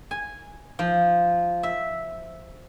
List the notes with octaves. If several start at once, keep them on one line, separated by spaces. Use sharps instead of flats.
G#5
F3
E5